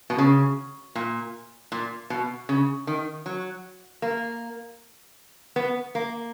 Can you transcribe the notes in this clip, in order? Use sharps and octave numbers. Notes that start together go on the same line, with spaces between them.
B2
C#3
A#2
A#2
B2
C#3
D#3
F#3
A#3
B3
A#3